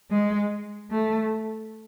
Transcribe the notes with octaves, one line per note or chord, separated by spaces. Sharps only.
G#3
A3